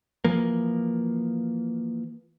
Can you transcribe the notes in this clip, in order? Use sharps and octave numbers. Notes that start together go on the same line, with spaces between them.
E3 F3 A#3